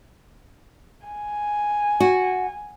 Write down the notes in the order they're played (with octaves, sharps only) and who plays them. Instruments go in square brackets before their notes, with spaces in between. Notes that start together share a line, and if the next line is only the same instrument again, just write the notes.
[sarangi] G#5
[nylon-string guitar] F#4